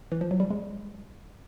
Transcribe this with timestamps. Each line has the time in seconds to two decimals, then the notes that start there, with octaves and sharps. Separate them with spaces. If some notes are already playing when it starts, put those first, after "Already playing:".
0.12 E3
0.21 F3
0.31 F#3
0.40 G3
0.51 G#3